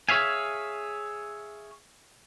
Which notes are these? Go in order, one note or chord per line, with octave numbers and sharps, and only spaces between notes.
G#4 C#5 E5 F5 G#5